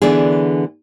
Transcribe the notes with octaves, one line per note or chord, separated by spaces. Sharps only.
D3 E3 B3 D4 G#4